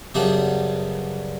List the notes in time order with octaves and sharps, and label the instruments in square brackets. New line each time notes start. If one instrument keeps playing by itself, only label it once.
[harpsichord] F#2 C#3 G3 B3 D4